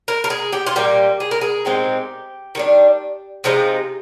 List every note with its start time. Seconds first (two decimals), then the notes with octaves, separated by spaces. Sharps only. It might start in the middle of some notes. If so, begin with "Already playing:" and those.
0.08 A#4
0.24 A#4
0.30 G#4
0.53 G4
0.67 F4
0.76 A#2 G3 A#3 G4
1.20 G#4
1.31 A#4
1.41 G#4
1.65 A#2 G#3 C4 D#4 G4
2.55 D#3 G3 D4
3.44 C3 F3 G#3 D#4